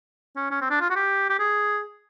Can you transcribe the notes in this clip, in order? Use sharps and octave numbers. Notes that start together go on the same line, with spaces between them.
C#4
C#4
C4
D4
F4
F#4
G4
G4
G#4